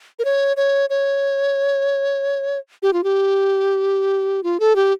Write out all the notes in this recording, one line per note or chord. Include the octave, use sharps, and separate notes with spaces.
A#4
C#5
C#5
C#5
G4
F4
G4
F4
A4
G4